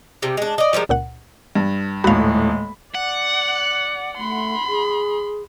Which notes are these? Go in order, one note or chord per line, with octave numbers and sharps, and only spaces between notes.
C3 G3
G#3 D4
D5 D#5
F3 G3 G#3 A#4
C#2 A#2 F#5
G2
D#1 A2 G#3 F#4 F5 B5
D5 F#5
A3 B5 C6
G#4